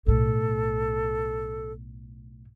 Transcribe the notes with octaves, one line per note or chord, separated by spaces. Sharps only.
B1 A2 A4